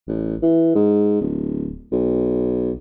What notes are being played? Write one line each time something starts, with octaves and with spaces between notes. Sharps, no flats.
A1
E3
G#2
D1
B1